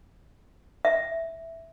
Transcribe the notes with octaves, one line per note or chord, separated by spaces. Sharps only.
E5